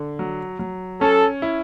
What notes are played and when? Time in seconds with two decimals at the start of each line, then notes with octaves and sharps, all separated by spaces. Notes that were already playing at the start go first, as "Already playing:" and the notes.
Already playing: D3
0.19 F#3
0.59 F#3
1.01 C#4 A4
1.42 E4